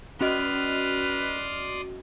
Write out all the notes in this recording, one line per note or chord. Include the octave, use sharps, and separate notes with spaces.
C#4 F#4 B4 D5 D#5 C6 D#6 F6